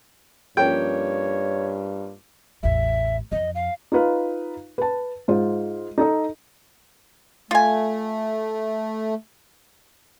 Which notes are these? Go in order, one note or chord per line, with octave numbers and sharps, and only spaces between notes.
G2 F3 A#3 C#4 C#5 G5
A1 E2 E5
F2 D#5
F5
D#4 F4 B4 F5
B4 A5
G#2 F4 C5
D#4 A4 D#5
A3 F4 G#5